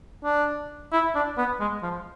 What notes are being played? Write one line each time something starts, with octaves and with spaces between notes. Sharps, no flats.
D4
E4
D4
B3
G#3
F3